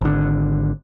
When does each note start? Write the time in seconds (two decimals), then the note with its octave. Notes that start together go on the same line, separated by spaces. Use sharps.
0.01 G#1 D3